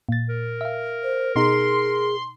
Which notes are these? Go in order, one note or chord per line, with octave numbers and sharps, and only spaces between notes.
A#2 A6
A#4
E5 F5
C5
B2 D#4 G#4 A#5 C6